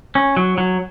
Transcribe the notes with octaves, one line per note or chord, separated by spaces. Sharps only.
C#4
F#3
F#3